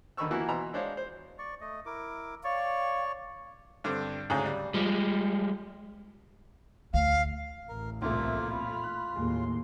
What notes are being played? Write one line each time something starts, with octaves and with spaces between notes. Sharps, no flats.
D#2 D3 D#3 B5 C#6 E6
E3 F3 A#3 B3 E4 F#4
B2 E3 A#5 C6
G#3 D4 C5 C#5 F5
C5
D5 C#6
A3 D#5
E4 A#4 D6
C#5 D5 F5 C#6
G2 D3 C4
D2 G#2 C#3
G3
F3 G3 G#3
D2 F5
A1 A#4
C2 F2 A#2 A3 A#3 F4 A#4 E5
F4 B5 F6
F#6
D#2 A2 G#3 A#3 C6